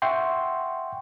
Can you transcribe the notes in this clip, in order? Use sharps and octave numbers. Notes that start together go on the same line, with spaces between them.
E5 F#5 G5 C6 C#6